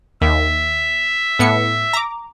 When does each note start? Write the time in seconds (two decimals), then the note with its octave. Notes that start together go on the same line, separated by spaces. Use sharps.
0.22 D#2 E5
1.39 A2 B3 C#7
1.93 A#5 D6